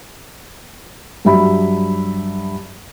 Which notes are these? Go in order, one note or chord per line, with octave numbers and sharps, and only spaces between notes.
G2 F#3 E5 B5